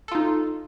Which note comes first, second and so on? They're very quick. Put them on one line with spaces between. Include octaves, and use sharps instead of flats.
A4 F4 D#4